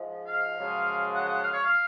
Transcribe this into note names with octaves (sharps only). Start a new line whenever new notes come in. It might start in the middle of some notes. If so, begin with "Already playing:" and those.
Already playing: G#2 F3 G#3
F5
F#2 C#3 F3 G#3
F#5
F#5
F5
C#5
F5